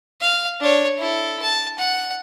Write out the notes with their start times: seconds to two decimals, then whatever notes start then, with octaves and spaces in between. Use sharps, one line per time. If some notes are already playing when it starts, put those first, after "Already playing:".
0.21 F5
0.60 D4 C#5
0.98 E4 A4
1.43 A5
1.79 F#5